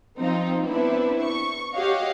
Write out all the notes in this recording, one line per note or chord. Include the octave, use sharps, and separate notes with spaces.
F3 C4 D#4 F4
B3 C4 D4 E4 B4
C#6
F#4 G4 C#5 D#5 F5 F#5